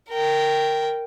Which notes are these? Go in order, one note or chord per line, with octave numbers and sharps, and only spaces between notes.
A#4 G5